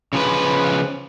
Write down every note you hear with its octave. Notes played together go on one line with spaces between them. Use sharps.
C#3 F3 B4